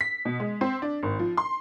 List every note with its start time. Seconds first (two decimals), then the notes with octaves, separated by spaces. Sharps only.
0.01 B6
0.25 B2
0.40 G#3
0.61 C4
0.82 D4
1.03 G#1
1.19 F3
1.37 C6